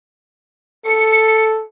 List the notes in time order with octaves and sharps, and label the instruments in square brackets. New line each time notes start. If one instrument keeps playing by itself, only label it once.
[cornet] A4 [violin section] C#7